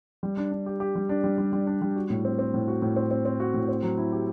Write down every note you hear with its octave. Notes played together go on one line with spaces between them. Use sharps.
G3
D4
D4
G4
G4
G3
D4
G3
G3
G3
D4
G3
F#4
A2
C4
C4
A2
F#4
A2
C4
C4
C4
F#4
A2
C4
F#3
E4
G4